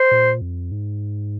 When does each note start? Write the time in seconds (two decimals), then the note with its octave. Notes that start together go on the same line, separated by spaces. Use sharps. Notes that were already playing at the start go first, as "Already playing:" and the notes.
Already playing: C5
0.11 A#2
0.41 F2
0.71 G#2